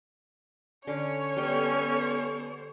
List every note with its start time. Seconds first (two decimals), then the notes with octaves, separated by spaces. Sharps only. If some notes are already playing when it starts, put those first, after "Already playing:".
0.87 D3 C#4 C#5
1.36 G3 B3 A4 G5